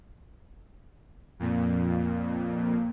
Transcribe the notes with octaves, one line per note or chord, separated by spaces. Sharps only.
F2 A#2